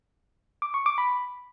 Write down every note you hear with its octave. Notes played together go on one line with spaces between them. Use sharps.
D6
C#6
D6
B5